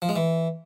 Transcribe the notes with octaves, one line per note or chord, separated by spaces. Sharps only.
F3
G#3
E3